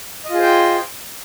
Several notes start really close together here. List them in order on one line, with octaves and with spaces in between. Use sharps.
D#5 F4 G#4 C5 G5